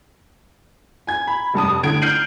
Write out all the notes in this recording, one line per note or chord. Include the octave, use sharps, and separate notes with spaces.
G#5 G#6
B5
F1 G2 A5 D#6
A2 D3 G#6 D7
F6 G6 C7 D7 D#7 F#7